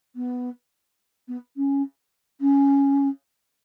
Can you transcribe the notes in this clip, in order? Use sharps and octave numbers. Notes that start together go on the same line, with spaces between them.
B3
B3
C#4
C#4